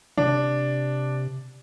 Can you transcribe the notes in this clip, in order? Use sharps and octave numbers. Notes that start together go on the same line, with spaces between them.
C3 D4